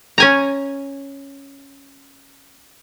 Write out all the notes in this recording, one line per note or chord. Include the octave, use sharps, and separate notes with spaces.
C#4 G#5 A#5